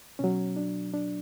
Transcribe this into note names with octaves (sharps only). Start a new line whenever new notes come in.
B2 F#3 C#4
D4
D4